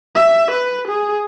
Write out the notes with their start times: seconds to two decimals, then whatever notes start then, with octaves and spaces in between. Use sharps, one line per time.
0.15 E5
0.51 B4
0.87 G#4